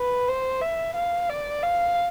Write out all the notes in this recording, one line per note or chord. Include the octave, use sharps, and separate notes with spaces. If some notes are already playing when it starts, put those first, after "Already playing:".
Already playing: B4
C5
E5
F5
D5
F5